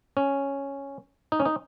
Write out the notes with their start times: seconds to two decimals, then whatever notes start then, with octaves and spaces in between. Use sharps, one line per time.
0.17 C#4
1.32 D#4
1.40 C#4
1.45 D#4